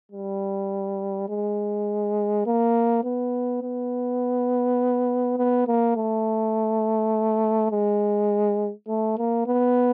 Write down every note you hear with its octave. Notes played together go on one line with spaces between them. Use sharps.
G3
G#3
A#3
B3
B3
B3
A#3
A3
G#3
A3
A#3
B3